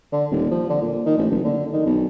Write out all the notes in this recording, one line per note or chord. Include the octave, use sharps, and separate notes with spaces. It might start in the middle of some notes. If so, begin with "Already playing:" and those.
D3
D#1
F3
D3
A#2
D#3
A1
F#1
D3
D#3
B1